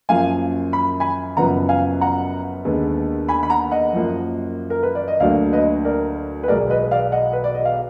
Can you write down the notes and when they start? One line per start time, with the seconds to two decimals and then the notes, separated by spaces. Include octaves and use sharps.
0.09 F#2 F3 A#3 F5 G#5
0.73 B5
1.00 G#5 B5
1.37 F#1 F#2 F3 B3 F#5 A#5
1.69 F5 G#5
2.01 F#5 A#5
2.65 D#2 D3 G#3 B3
3.29 G#5 B5
3.43 B5
3.50 F#5 A#5
3.71 D#5 F#5
3.93 F#2 F3 A#3
4.70 A#4
4.83 B4
4.95 D5
5.08 D#5
5.20 D2 D3 F#3 A#3 D5 F5
5.53 B4 D#5
5.84 A#4 D5
6.43 B4
6.48 B1 B2 G#3 B3 A#4 D5
6.70 B4 D#5
6.91 D5 F5
7.12 D#5 F#5
7.33 B4
7.44 D5
7.54 D#5
7.65 F5